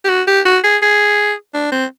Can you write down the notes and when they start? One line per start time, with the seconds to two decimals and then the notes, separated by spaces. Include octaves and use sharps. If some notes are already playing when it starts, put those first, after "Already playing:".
0.05 G4
0.09 F#4
0.27 G4
0.45 F#4
0.64 G#4
0.82 G#4
1.54 D4
1.72 C4